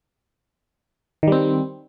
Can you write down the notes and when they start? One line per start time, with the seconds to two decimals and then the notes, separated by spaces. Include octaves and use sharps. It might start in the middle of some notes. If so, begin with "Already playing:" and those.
1.23 D#3
1.27 G3
1.32 C4